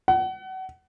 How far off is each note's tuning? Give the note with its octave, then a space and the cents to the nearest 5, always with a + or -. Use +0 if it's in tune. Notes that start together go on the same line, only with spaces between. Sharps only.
F#5 +30